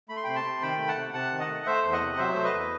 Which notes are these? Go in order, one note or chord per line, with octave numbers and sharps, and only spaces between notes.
A3 B5
C6
C3 G5 B5
A5 C6
C3
D#3 G5 B5
A3
F#5 A5
C3
C3 F#5 A5
D#3
D#5 F#5
A3
A3 C5 E5
E2
D#5 F#5
C3
F#3 C5 E5
A3 C5
B4 D#5
E2